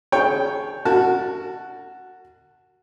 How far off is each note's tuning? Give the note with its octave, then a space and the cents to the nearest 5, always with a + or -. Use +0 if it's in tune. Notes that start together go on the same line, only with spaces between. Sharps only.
G#4 +30 C#5 +0 G5 +0
F#4 +0 A#4 -40 A5 +0